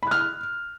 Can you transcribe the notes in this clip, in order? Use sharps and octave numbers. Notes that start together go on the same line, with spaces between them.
B5 F6 F#6